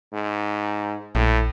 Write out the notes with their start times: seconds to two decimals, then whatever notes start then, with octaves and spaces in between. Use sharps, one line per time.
0.13 G#2
1.15 A#1 A2